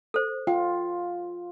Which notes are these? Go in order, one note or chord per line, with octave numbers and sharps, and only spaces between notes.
A4 C5
F4 G5